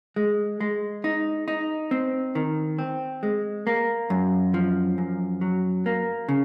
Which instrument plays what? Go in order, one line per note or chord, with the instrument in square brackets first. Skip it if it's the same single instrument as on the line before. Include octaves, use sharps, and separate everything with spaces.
[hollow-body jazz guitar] G#3
G#3
D#4
D#4
C4
D#3
C4
G#3
A#3
F#2
F3
F#2
F#3
A#3
C#3